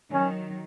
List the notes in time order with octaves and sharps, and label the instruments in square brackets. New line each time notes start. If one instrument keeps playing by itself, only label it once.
[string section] D#3 F#3 [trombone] C#4